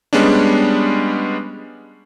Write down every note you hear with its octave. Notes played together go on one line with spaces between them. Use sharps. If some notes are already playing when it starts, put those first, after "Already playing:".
G3 G#3 B3 C#4 D4